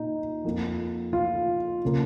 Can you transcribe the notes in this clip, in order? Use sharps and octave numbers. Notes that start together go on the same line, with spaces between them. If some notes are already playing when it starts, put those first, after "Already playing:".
Already playing: A#2 D#4
F2 F3 A#3
F4
C#3 A#3